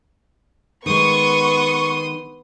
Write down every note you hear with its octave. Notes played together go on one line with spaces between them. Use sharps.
D#3 G#3 B3 C6 C#6 D#6